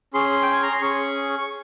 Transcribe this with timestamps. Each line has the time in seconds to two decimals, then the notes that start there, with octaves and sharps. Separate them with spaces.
0.14 C#4 G#4 C6
0.42 G5
0.52 G#5
0.63 A#5
0.72 C6
0.81 C#4 G#4 C#6
1.38 C#6